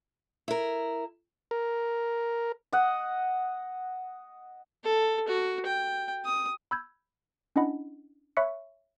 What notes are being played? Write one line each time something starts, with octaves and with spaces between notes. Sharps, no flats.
E4 A#4
A#4
D#5 F#5
A4
F#4
G5
D#6
B5 E6 G6 G#6
C#4 D4 E4 D#5 F#5 B5
C#5 E5 B5 C#6 F#6 C#7